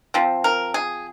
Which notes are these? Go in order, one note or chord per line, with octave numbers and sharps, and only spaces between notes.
F3 C4
A#4
G#4